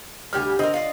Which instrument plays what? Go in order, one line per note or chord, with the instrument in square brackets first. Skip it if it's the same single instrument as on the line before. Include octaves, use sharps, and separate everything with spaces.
[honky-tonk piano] D2 F6 [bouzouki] G3 G4 G#5
[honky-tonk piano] D3 D#5 [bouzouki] C4 A#4
[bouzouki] F4 D5